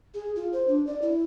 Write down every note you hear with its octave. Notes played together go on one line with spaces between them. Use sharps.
G#4
F4
C5
D4
D5
E4